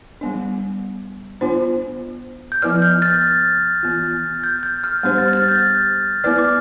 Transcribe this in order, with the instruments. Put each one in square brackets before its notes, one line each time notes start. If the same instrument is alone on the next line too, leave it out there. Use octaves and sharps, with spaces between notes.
[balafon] G3 B3 D4
B3 D4 F4 C5
[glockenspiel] G6
[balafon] F3 B3 E4 B4 D5 [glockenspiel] F6
[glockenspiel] G6
F6 A6
[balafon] E3 B3 F4
[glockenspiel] G6
G6
F6
[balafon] G3 B3 D4 G4 C5
[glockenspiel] F6 A6
F6 A6
G6
[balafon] B3 E4 B4 D5 [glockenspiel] F6
[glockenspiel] D6